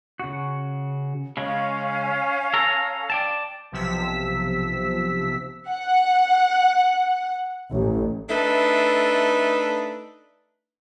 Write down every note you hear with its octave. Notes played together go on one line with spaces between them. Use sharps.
C#3 F#4
C#3 G#3 C#4 F5
A4 A#5
D5 G5 A5
B1 C3 F3 E6 B6
F#5
A1
A3 D4 D#4 A4 B4 E5